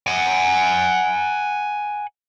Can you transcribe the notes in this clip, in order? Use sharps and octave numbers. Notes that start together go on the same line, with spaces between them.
F#5 G#5